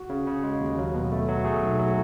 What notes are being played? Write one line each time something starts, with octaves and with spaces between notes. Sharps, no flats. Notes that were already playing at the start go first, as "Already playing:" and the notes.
Already playing: F#4
C#3
C#3
G#3
D#2
F#3
B2
A3
F#3
A3 G#4
B1
F#3